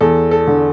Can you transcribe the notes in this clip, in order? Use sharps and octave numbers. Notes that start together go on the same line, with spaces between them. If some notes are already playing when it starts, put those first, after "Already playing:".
E2 A4
A4
D3